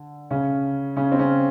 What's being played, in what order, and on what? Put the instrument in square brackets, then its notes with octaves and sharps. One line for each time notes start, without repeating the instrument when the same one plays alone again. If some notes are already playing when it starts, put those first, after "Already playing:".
Already playing: [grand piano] D3
C#3 C#4
C#3 C#4
C4
C#3 C#4